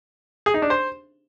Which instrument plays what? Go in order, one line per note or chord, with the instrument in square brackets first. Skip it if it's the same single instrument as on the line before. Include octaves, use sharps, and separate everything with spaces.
[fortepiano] G#4
D#4
D4
C5